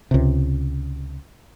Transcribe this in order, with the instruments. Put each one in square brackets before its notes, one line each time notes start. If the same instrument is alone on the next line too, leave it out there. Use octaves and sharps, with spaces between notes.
[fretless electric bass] C#2 C3